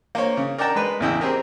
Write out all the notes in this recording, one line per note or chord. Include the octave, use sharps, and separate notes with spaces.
A#3 C5 C#5
C#3
A#4 D5 F#5 G5 A5 A#5
G#3 B4
A1 E2 C#3 E4 D#5 G5
C4 G4 G#4 A#4